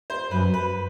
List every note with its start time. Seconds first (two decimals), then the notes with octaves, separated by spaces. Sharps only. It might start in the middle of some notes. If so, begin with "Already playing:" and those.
0.10 C5
0.31 F#2 B4
0.54 B4